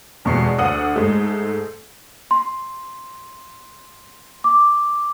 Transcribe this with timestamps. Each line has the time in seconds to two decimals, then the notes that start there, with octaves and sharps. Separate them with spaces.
0.25 F1 E2 B2 G#3 C#6 C7
0.58 D2 D3 F#5 D#6 E6
0.96 G#2 G#3 A3
2.31 C6
4.44 D6